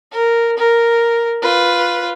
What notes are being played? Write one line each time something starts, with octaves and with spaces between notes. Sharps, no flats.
A#4
A#4
F4 B4